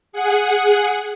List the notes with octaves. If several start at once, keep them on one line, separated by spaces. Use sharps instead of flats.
G#4 F#5